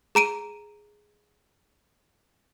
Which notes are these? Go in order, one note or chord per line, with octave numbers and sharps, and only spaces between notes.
G#4 A#5 D7 D#7